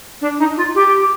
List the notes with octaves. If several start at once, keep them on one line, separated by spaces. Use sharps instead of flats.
D4
D#4
F4
G4